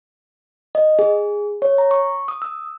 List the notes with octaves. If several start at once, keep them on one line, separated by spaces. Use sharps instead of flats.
D#5
G#4
C#5
A#5
C#6
D#6
E6